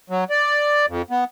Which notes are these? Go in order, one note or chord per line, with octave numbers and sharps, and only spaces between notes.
F#3
D5
F2
B3